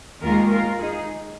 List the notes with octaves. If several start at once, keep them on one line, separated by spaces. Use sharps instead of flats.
D#2 D#3 G#3 F4 A#4
F4 A#4
D#4 G#4